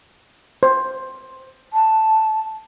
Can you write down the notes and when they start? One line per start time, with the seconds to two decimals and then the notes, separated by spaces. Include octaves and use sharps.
0.63 C5
1.73 A5